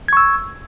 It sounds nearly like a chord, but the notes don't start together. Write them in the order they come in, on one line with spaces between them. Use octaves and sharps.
G#6 C#6 E6